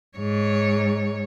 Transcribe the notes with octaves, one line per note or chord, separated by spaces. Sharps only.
G#2 C#5